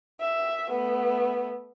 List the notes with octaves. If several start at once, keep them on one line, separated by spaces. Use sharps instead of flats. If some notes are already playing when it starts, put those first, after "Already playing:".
E5
A3 B3